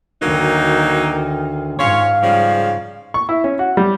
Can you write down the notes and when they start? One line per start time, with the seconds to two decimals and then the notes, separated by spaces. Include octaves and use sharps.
0.22 D2 D#3 F#3 A#3 D#4
1.80 G#2 C#4 F4 C#5 F5
2.23 C#3 F3 G3
3.14 C#6
3.29 E4
3.44 C#4
3.59 F#4
3.77 G3